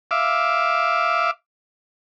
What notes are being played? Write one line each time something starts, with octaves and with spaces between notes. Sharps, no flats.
E5 F5 D6